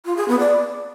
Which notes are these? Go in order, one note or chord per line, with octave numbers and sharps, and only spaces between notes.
F4
G#4
B3
D5